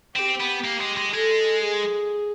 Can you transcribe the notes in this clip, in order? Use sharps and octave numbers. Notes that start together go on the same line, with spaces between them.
C4 G4
B3
A#3
G#3
G#3
G#3 A4
G#4